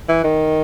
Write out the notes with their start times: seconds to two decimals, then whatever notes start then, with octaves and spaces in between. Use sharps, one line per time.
0.09 E3
0.24 D#3